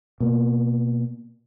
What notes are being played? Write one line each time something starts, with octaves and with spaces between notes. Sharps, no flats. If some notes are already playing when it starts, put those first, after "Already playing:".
B2 A#3